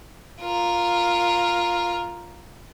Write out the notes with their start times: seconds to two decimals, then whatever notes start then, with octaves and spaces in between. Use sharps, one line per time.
0.42 F4 A#4